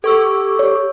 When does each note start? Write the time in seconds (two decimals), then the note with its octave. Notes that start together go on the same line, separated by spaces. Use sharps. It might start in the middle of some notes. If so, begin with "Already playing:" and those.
0.04 G4 A4 C#6 E6
0.59 C#5